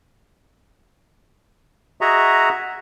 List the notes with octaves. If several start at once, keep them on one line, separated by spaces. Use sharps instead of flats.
F#4 G#4 D#5 E5 F#5 A#5